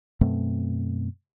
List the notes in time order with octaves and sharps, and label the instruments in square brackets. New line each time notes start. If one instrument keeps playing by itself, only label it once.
[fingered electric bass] F#2 B2 A3 C4